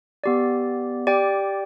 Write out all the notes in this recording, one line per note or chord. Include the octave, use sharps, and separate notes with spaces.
B3 G4 D5
G4 D5 G5